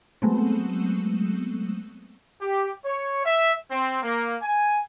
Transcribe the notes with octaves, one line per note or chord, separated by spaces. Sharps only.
F#3 G#3 A3 B3 C4
G4
C#5
E5
C4
A#3
G#5